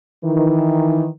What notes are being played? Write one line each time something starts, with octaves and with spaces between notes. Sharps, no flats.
D#3 E3